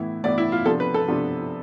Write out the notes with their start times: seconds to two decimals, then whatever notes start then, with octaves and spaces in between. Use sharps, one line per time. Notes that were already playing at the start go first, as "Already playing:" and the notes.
Already playing: A2 E3 B3 E4
0.24 A2 E3 B3 E4 D5
0.38 E4
0.52 F4
0.66 C3 F3 B3 D4 A4
0.80 B4
0.94 A4
1.08 C3 F3 B3 D4